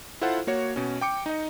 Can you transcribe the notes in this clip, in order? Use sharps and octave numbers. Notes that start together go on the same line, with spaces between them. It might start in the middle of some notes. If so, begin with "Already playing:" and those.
E4 F4 A4 C5 F5 F#5
A#3 F#4 C#5
B2 C#4
G5 D6 C#7
D#4 D#5